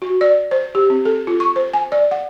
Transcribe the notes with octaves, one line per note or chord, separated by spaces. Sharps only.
F#4
D5
C5
G4
C4
A4
F4
C#6
C5
G#5
D5
F#5